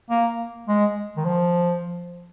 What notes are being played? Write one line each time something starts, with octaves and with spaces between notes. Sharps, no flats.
A#3
G#3
D#3
F3